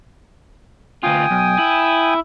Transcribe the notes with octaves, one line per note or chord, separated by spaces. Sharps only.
D2 F4 G5 G#5 D#6
B1
E4